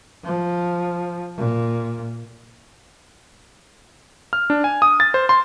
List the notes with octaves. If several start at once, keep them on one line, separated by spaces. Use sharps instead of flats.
F3
A#2
F6
D4
G#5
D#6
A6
C5
C6